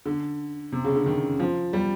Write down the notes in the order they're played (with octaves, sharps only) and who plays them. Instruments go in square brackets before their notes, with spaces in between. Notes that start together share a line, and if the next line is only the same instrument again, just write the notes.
[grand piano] D3
C3
C#3
D3
D#3
F3
G3